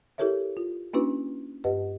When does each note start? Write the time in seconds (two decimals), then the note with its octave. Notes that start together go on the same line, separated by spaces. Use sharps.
0.18 E4 G4 A4 A#4 C#5 E5
0.57 F4
0.93 A#3 C#4 D4 E4 F#4 B4
1.64 G2 G4 B4 D#5 F#5